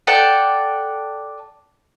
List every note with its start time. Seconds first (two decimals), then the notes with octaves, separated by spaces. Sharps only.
0.07 A4 D5 F#5 G5